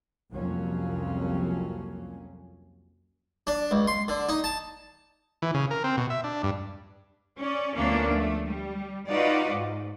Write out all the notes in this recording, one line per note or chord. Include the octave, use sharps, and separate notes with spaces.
C2 F2 F3 F#3 A#3 C#4
D4
C#2
C6
D3
D#4
A5
E3
C#3
A#4
C4
B2
E5
D4
G2
C#4 D5
D2 F3 A#3 B3 C#4 D4
A3
G3
D#4 F4 F#4 B4 D5 D#5
G#2